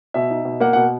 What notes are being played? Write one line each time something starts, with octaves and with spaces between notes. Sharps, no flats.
B2 E5
D#4
B2
A#3 F#5
B2 F#5